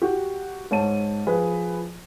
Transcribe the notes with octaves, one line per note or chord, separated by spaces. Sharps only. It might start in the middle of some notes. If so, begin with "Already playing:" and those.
F#4 G4
G#2 C#5 A5 D#7
F3 G#4 B4